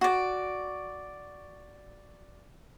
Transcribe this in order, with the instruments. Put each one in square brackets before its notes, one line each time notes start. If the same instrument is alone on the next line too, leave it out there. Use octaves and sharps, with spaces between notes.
[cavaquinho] F#4 D5